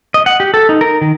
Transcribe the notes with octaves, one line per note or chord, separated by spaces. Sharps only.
D#5
F#5
G4
A4
D#4
A#4
D#3